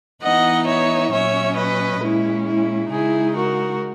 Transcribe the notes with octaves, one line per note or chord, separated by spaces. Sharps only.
E3 B3 D#4 D#5 F#5
C#5 E5
A#2 F#3 C#4 C#5 E5
B4 D#5
A#2 G#3 C#4 E4
E4
C#3 G#3 D#4 E4 G#4
F#4 A#4